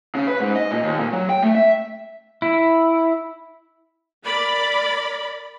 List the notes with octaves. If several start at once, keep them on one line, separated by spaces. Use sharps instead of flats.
C#3
B4
G#2
D#5
A#2
D#2
A#2
F#3
G5
A3
E5
E4
A#4 D5 B5